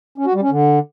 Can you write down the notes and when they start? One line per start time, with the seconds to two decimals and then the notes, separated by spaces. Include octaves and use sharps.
0.18 C#4
0.26 F#4
0.34 G3
0.43 C#4
0.51 D3